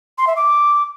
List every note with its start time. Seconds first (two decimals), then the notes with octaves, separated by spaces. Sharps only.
0.18 C6
0.27 E5
0.36 D6